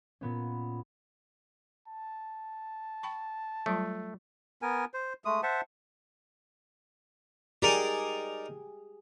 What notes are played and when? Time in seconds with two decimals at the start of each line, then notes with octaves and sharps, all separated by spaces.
0.21 A#2 B3 C#4
1.88 A5
3.03 G5 B5 C#6
3.66 F#3 G3 A3 F4
4.62 B3 A#4 G#5
4.94 C5
5.25 G#3 A3 D#6
5.43 C5 E5 F#5 A5
7.62 D#4 G4 G#4 A#4 D5